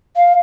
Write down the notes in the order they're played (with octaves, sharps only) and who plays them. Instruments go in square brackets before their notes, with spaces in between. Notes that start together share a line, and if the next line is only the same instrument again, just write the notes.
[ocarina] F5